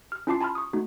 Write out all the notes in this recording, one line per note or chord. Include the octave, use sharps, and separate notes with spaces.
F6
C#4 E4 F4 A5 D6 C7
G#5 A5 B5 C6 F6
C#6 D#6
A3 D#4 F#4